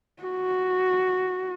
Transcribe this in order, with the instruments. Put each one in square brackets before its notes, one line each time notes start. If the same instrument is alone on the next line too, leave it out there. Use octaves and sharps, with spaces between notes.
[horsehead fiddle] F#4